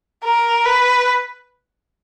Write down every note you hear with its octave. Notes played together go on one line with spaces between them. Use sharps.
A#4
B4